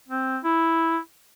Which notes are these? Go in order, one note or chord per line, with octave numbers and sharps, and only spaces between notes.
C4
E4